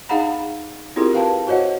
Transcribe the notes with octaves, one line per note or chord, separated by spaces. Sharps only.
D#4 G#4 F5 F#5 A#5 B5
C4 E4 F4 G4 G#4 A#4
B4 F5 G5 A5
F#4 C5 C#5 D#5 F#5